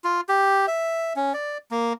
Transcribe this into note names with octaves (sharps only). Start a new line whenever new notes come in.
F4
G4
E5
C#4
D5
A#3